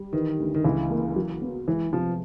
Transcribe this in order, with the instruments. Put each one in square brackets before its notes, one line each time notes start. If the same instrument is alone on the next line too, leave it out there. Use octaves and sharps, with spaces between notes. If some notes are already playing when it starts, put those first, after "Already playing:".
Already playing: [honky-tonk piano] G3
[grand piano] D#3 [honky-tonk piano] E3
[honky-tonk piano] D2
[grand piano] D#3
[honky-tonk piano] C#2 [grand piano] E3
[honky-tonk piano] A#3
F#3
B3
[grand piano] E3 [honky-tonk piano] G#3
[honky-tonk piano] C3 [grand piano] F3